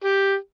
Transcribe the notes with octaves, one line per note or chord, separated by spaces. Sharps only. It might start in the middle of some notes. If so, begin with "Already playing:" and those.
G4